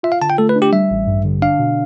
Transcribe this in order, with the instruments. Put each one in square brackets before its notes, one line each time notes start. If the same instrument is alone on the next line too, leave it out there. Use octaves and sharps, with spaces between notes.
[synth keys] F4 [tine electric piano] E5
[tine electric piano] F5
[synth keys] D3 [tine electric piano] A5
[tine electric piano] G5
[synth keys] A3 [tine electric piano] A4
[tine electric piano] B4
[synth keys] D4
[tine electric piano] G4
[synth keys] G3 [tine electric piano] E5
[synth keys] A1
G2
D3
[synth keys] D4 [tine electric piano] F5
[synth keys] B2